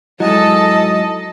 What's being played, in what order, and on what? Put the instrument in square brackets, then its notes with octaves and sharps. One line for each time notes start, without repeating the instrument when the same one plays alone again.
[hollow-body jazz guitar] G#2 F#3 [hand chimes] E4 [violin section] A4 A5 [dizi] D#5